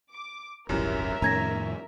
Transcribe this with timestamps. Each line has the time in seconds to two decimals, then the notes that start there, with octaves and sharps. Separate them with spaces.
0.11 D6
0.69 D#1 G#1 F#2 E3 G3 A#4 E5
1.22 F2 A2 D#3 C#4 A#5 G#6 A#6